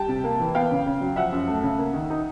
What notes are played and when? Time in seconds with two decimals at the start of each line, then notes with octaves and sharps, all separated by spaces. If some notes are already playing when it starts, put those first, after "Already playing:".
Already playing: G3 G5 A5
0.08 C3
0.24 A#3
0.40 E3
0.54 B3 F5 G5
0.71 C#3
0.86 C#3
1.01 F#3
1.16 F3 E5 F#5
1.32 F#2
1.48 A3
1.63 C#3
1.79 A#3
1.94 D#3
2.10 D#4